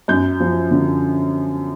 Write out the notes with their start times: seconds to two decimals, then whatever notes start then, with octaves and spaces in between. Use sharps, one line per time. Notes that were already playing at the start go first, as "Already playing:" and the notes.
0.08 F#2 G6
0.40 F3
0.71 D3